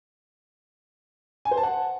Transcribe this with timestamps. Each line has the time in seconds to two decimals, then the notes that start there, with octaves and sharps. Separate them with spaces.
1.45 G#5
1.51 C5
1.57 A5
1.63 F#5